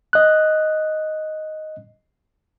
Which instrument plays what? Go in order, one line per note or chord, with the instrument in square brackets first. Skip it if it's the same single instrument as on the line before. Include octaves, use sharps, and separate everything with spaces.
[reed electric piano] D#5 F#6